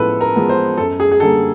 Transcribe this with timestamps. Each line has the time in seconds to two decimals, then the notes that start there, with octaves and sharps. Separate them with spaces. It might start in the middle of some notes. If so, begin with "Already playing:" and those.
Already playing: A2 F3 G#3 B3 A4 B4
0.21 A#4
0.35 F3 G#3 B3
0.49 C5
0.78 F#2 A4
1.00 G#4
1.11 G#4
1.20 D3 G3 A#3 A4